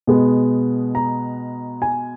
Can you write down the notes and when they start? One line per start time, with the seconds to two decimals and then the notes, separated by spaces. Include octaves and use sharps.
0.07 B2 G#3 B3
0.95 A#5
1.82 G#5